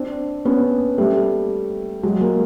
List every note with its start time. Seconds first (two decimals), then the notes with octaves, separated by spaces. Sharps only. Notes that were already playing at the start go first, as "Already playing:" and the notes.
Already playing: C4 D4
0.45 B3 C#4
0.98 G3 A3
2.03 F#3 G#3
2.21 G#3 A#3